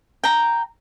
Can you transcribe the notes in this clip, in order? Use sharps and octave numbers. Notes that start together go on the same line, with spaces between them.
G5 A#5